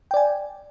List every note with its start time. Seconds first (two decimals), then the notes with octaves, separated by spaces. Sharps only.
0.11 G5
0.14 D5
0.17 G#5